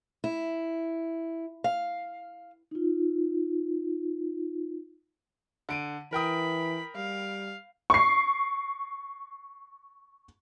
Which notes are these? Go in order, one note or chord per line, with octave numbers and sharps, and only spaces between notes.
E4
F5
D#4 F4
D3 D7 D#7
E3 A#4 G5 B5 D#6
G3 F5
C#6 C7